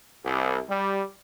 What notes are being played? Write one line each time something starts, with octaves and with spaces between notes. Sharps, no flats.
C2
G3